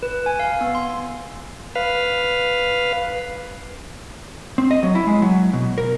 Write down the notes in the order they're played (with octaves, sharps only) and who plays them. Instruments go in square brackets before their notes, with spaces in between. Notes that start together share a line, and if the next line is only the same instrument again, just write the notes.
[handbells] B4
G#5
F5
B3
C6
[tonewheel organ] B4 F5
[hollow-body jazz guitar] C4
D#5
F#3
E4
G#3
F#3
B2
A#4